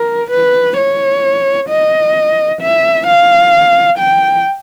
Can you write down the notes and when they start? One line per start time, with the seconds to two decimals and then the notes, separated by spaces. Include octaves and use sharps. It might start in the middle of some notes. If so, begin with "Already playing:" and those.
Already playing: A#4
0.31 B4
0.78 C#5
1.69 D#5
2.62 E5
3.07 F5
3.98 G5